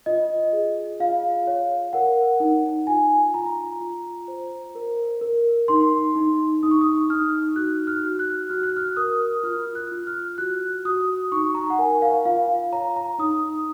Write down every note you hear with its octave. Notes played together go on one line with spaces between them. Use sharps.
F4 D#5
G#4
F4 F5
C#5
A#4 F#5
D#4
F4 G#5
F4 A#5
F4
C5
A#4
A#4
D#4 C6
D#4
D#4 D#6
C#6
D#6
D#4 F6
F#4 F#6
F6
F#4
F#6
F#4 F6
F#6
F6
A#4 D#6
F4 F6
F#6
F4
F6
F#4 F#6
F#4 D#6
D#4 C#6
A#5
F#5
A#4 G#5
F5
F4 F5
C#5 A#5
A#5
D#4 D#6